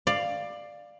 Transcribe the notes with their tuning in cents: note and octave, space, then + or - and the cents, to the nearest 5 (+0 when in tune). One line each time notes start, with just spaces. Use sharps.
D5 +15 F5 +0